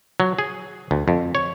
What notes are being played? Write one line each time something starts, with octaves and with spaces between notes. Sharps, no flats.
F#3
G#4
D2
F2
C#5